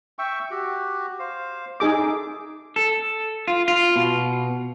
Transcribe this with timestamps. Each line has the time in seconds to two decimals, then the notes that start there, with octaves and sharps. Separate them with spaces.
0.19 E5 G5 C#6
0.51 F#4 G4
1.19 C5 F5
1.80 D#4 G#4 A4 E5 D6
2.76 A4
3.48 F4
3.68 F4
3.96 B2